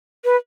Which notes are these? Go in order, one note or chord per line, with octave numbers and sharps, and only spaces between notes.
B4